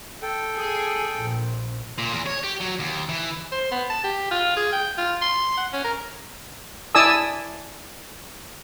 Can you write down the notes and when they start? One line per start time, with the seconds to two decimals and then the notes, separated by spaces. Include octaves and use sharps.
0.22 A4 G5
0.56 G#4
1.19 A#1
1.98 A#2
2.13 E2
2.27 C#5
2.44 G4
2.61 F#3
2.80 D#2
3.09 E3
3.52 C5
3.71 B3
3.90 A5
4.04 G4
4.31 F4
4.57 G#4
4.72 G5
4.98 F4
5.21 C6
5.57 F#5
5.73 C#4
5.84 A#4
6.95 E4 D5 G#5 A5 D#6 E6